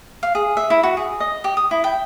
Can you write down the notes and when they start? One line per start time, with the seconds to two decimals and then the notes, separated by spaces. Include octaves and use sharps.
0.23 F5
0.35 G#4
0.57 E5
0.70 E4
0.83 F#4
0.97 G#4
1.20 D#5
1.44 G4
1.57 D#6
1.71 E4
1.84 G5